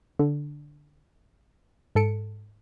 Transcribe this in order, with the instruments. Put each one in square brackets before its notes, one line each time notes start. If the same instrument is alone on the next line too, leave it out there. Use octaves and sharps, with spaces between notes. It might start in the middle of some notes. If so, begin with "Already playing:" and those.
[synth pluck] D3
G#2 A4 C#7 D7